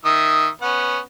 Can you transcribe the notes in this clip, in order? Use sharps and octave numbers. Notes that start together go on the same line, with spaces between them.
D#3 E5 D#6
B3 C#4 F#5